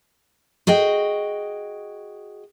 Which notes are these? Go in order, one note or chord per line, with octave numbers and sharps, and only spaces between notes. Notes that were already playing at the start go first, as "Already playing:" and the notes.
F#4 G#4 D#5 G5